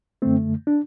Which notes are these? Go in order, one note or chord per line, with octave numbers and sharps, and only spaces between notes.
F#2 D3 A3 C4
D4